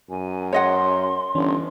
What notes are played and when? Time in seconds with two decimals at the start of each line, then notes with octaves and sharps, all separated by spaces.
0.10 F#2 G#5
0.53 C#5 D#5 F#5 C6
1.35 G1 E3 C#4 D4